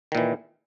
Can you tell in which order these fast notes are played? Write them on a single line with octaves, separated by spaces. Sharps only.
D#3 A#2 E3